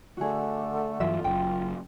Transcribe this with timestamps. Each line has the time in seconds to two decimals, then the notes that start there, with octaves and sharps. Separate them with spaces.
0.17 D3 A3 F#4 G#4
1.00 G2 E3 F#3 F4 E5
1.24 F#1 F#2 G5